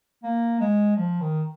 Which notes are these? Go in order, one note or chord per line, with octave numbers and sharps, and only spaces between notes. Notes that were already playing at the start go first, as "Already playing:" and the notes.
A#3
G#3
F3
D#3